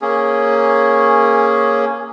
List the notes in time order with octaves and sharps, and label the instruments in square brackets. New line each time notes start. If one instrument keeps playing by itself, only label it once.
[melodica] A#3 C#4 G#4